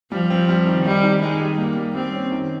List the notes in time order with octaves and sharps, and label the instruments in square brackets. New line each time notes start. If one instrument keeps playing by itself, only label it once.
[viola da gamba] F3 [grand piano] G3
[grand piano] C4
G3
D#3
[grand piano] D#3 [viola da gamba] G3
[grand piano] D#3
[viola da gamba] G#3 [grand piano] D#4
[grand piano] G3
[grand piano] G3 [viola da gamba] A#3
[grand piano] G3
[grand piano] G3 [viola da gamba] C4
[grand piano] C#4
D#3